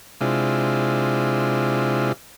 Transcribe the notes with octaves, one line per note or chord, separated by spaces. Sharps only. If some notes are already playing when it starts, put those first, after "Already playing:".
C3 G#3 D4 E4 F4